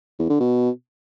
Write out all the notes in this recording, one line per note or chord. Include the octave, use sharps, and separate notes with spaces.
E2
D3
B2